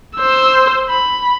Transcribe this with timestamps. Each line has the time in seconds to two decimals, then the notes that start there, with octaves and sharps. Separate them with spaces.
0.16 C5 E6
0.90 B5